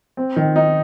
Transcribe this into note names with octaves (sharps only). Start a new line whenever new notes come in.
C4
D#3
D#4